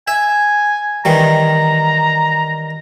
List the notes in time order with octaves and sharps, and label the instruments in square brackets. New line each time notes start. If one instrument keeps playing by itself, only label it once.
[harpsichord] E5 [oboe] G#5
[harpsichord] D#3 E3 G3 [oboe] A#5